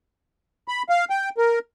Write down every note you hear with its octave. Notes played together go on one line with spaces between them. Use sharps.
B5
F5
G5
A#4